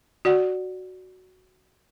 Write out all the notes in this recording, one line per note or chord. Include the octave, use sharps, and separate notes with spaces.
F#4 D5 F#5